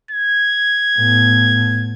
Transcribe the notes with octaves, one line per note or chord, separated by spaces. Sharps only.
G#6
A2 B3